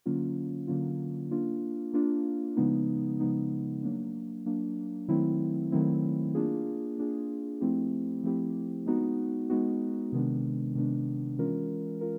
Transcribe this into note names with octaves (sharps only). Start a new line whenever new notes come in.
D3 F#3 A#3 C#4 F4
D3 F#3 A#3 C#4 F4
A#3 D4 F4
A#3 D4 F4
C#3 F3 G#3 B3 D#4
C#3 F3 G#3 B3 D#4
F#3 A#3 D4
F#3 A#3 D4
D#3 F#3 A3 C4 E4
D#3 F#3 A3 C4 E4
A#3 D4 F4 G#4
A#3 D4 F4 G#4
F3 A3 C4 E4 G4
F3 A3 C4 E4 G4
G#3 B3 D#4 F#4
G#3 B3 D#4 F#4
C3 D#3 G#3 B3 D4
C3 D#3 G#3 B3 D4
E3 G#3 C#4 F4 A#4
F4 A#4